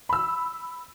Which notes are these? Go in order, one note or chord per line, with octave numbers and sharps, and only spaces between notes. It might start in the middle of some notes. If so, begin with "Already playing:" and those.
B5 E6